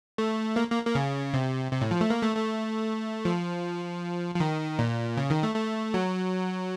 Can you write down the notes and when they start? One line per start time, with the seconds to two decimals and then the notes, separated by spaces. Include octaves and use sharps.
0.18 A3
0.56 A#3
0.72 A#3
0.86 A#3
0.95 C#3
1.34 C3
1.72 C3
1.81 A2
1.91 F3
2.01 A3
2.10 A#3
2.22 A3
2.36 A3
3.25 F3
4.35 F3
4.40 D#3
4.79 A#2
5.17 C#3
5.30 D#3
5.43 A3
5.56 A3
5.94 F#3